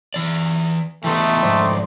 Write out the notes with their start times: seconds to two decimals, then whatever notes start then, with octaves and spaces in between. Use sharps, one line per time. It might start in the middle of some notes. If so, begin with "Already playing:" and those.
0.14 E3 D5
1.04 E3 G3 A3 B3 D#4 G5 C6
1.43 F2 G#2 C5 D5